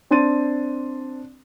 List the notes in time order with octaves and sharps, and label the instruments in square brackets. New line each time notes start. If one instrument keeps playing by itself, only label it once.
[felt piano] C4 D4 C6 A6 D#7